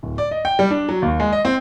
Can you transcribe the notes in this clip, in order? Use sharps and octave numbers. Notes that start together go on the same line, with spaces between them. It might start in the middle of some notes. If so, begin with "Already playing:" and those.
D1
D5
D#5
G5
G3
D4
F#3
D#2
G#3
D#5
C4